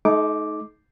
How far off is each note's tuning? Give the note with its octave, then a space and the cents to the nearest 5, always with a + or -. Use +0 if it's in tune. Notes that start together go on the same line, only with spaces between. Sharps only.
A3 -45 D#4 +10 D6 +0